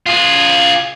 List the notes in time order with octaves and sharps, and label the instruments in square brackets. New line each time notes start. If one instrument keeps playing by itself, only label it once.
[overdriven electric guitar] F4 G#4